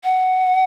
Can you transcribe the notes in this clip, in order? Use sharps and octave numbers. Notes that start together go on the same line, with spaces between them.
F#5